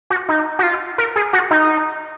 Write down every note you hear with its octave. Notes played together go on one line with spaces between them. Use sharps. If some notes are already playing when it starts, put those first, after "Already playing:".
F#4
D#4
F#4
F4
A#4
G#4
F#4
D#4